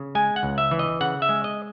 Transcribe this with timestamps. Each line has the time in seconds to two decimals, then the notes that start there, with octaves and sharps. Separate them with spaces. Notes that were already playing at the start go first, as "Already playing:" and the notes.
Already playing: C#3
0.15 G#3 G#5
0.36 F#5
0.43 C#2
0.58 E5
0.71 E3
0.79 D#5
1.01 C#3 F#5
1.22 E5
1.29 G#3
1.44 D#5